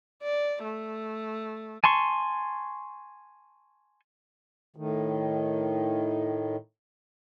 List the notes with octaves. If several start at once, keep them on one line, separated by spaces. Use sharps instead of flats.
D5
A3
G#5 A5 C6 C#6
A2 D#3